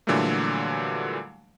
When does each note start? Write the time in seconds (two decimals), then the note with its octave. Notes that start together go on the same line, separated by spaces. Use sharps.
0.07 A#2 D3 E3 F#3 G3 A3